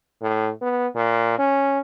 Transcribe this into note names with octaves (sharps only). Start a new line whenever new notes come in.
A2
B3
A#2
C#4